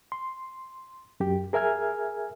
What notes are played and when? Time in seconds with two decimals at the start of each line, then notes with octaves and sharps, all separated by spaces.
0.12 C6
1.20 F#2 G4
1.53 G#4 A#4 E5 G#5 F6 G#6